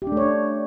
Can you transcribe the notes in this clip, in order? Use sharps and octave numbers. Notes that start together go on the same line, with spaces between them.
G4
D4
A3
C#5
D4